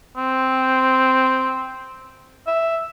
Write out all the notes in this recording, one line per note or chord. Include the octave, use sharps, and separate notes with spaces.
C4
E5